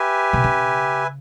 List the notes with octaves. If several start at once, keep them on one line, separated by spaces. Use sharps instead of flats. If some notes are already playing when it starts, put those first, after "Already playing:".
Already playing: G4 B4 E5 G#5
C3
C#3